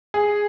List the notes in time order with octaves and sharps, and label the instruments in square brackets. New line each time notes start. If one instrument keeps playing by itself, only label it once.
[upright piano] G#4